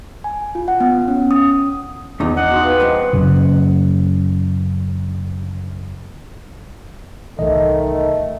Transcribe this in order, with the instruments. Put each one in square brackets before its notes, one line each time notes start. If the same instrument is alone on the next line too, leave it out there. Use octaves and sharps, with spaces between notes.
[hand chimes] G#5
F4
F#5
B3
C#4
D#6
[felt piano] E2 [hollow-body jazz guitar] D#4 E4
[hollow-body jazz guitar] D#5 [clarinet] F#5
[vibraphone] D#4 C6 D#6 [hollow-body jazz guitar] F#4
[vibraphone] B4 G5 C6 [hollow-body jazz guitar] F5
[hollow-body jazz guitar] G2 C4 B4 [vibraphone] D#5
[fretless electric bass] F#2 C#3
[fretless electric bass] C2 A2 E3 [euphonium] D#3 [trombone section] A3 [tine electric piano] D#5